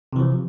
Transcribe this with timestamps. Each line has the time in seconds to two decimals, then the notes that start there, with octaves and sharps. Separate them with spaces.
0.13 C3
0.16 E3
0.20 F3